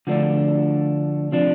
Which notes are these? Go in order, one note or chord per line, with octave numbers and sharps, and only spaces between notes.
D3 F3 A3 D4
C3 F3 D4